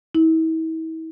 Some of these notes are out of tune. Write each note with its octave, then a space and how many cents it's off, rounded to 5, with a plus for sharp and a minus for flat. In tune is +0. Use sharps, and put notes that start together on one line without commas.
E4 -40